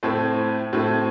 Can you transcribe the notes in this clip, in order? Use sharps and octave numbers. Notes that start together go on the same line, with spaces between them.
A2 A3 C4
A2 A3 C4